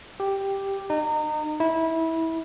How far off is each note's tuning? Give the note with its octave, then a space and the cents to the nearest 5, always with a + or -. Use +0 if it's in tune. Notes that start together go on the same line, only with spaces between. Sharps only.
G4 +0
D#4 -30
E4 -20